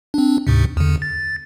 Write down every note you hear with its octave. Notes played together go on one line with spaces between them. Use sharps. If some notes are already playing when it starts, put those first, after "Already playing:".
C4 D4
D2 G#2 C3
E2 D3
A6